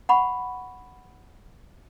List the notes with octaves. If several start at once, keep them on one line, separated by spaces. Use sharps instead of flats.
F#5 B5 C#6